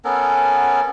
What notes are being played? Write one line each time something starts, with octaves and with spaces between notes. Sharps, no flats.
B3 C#4 A4 A#4